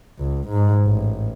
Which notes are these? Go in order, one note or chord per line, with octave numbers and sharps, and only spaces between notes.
C#2
G#2
A1